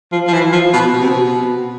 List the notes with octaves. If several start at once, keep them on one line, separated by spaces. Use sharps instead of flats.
F3
F3
E3
F3
B2
B2
C3
B2